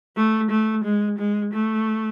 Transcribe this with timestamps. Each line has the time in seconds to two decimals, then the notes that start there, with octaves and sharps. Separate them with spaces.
0.16 A3
0.50 A3
0.84 G#3
1.18 G#3
1.53 A3